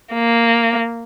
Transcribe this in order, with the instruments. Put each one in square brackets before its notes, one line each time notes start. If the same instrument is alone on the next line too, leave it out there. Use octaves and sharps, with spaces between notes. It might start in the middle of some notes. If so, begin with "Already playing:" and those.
[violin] A#3